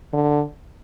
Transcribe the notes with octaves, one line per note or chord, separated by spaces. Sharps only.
D3